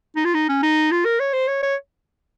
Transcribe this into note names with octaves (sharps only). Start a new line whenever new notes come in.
D#4
F4
D#4
C#4
D#4
F4
A#4
C#5
C5
C#5
C#5